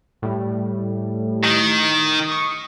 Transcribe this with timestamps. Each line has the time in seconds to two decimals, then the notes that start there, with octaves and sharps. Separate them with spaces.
0.22 A2 G3
1.44 D#3
2.28 C#6 D#6